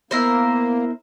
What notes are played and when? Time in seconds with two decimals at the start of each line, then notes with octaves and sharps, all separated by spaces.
0.11 A#3 B3 E4 A#4 C5